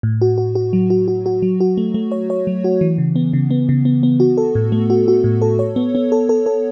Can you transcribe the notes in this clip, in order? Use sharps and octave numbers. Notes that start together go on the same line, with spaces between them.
A2
F#4
F#4
F#4
F#3
F#4
F#4
F#4
F#3
F#4
A3
A3
C#5
C#5
F#3
F#4
E3
C#3
B3
C#3
B3
C#3
B3
B3
F#4
A4
A2
A3
F#4
F#4
A2
A4
C#5
B3
B3
A4
A4
A4